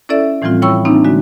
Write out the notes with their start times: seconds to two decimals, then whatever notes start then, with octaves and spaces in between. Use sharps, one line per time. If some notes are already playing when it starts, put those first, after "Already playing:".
0.09 C#4 E4 A4 D5 E5
0.42 A2 E3 F3 G3 C4 F4
0.62 E4 C#5 G5 B5 C#6 E6
0.85 E3 A#3 C4 D4 D#4
1.05 D3 G#3 F#4